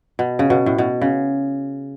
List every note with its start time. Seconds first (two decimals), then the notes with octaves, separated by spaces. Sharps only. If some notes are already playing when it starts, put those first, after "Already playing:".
0.19 B2
0.39 C#3
0.50 B2
0.66 A2
0.78 B2
1.01 C#3